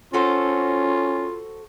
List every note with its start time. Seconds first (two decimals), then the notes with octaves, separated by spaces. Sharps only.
0.13 C#4 F4 F#4 A4 C5